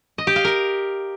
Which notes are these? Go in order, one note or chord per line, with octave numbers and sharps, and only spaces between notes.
D#5
G4
F5
A#4